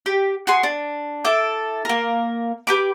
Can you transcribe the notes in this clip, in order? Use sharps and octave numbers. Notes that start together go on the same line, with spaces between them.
G4
F#4 G#4 C6
D4
E4 A4 D6
A#3 A#4
G4 B4 D6